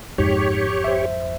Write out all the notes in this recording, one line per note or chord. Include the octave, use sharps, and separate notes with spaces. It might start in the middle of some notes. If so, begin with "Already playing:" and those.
G#1 F2 G#2 G4 C#5
C5 E5